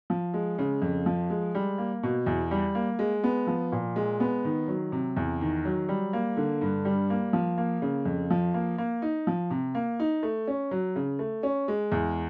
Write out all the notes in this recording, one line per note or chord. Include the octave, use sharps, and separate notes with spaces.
F3
G#3
C#3
F2
F3
G#3
G3
A#3
B2
E2
G3
A#3
G#3
B3
F3
A#2
G#3
B3
D#3
F#3
C3
E2
D#3
F#3
G3
A#3
D3
G2
G3
A#3
F3
A#3
C#3
F2
F3
A#3
A#3
D#4
F3
C3
A#3
D#4
A3
C#4
F#3
C#3
A3
C#4
G#3
E2